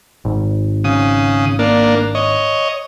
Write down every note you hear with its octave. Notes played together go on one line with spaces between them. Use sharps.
G#1
C#3 D#6
A#3 D4
C#5 D#5